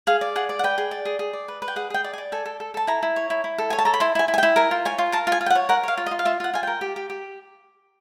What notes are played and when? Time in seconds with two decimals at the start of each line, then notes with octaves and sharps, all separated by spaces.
0.07 G#4 F5
0.21 D5
0.36 G#4 F#5
0.49 D5
0.59 F#5
0.64 B4 G5
0.78 G#4
0.91 D5
1.05 G#4
1.19 G#4
1.33 D5
1.48 B4
1.62 B4
1.68 G5
1.76 G#4 F#5
1.90 G#4 G5
2.04 D5
2.13 G#5
2.18 D5
2.32 A4 G#5
2.45 A4
2.60 A4
2.74 A4 A5
2.87 E4 A#5
3.03 E4
3.16 C#5
3.30 E4
3.44 E4
3.58 A4
3.70 C#5 G#5
3.79 A5
3.85 A4 A#5
3.94 B5
4.00 E4 C6
4.15 E4
4.19 G#5
4.28 E4
4.34 G#5
4.38 G5
4.43 E4
4.56 A#4 G#5
4.71 F4
4.85 C#5 G#5
4.98 F4
5.12 A#4 A5
5.27 F4
5.32 G#5
5.41 F4
5.46 G5
5.50 F#5
5.55 C#5
5.69 A#4 F#5
5.83 C#5 F5
5.97 F4
6.06 D#5
6.11 F4
6.19 F5
6.25 F4 E5
6.40 F4 F#5
6.54 F4 G#5
6.63 A#4 G5
6.81 G4
6.96 G4
7.10 G4